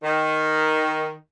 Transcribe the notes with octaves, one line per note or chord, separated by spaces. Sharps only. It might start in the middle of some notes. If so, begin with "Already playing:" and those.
D#3